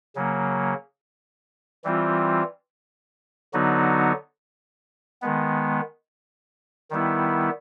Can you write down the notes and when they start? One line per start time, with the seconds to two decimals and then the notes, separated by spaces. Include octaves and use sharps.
0.15 C#3 F#3 A#3
1.84 E3 G3 C4 F4
3.53 D3 F#3 B3 D#4 F#4
5.22 D#3 G#3 B3
6.90 D#3 G3 B3 E4